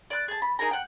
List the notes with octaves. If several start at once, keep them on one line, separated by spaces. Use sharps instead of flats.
D5 F#6
G#4 A5
B5
D#4 G#4 A#4 A#5
F#5 G5